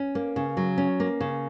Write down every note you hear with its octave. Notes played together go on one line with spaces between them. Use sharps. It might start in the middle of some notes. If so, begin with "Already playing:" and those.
Already playing: C#4
A#3
C#3
F#3
C#4
A#3
C#3